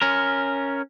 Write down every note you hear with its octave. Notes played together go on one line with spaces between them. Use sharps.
C#4 A#4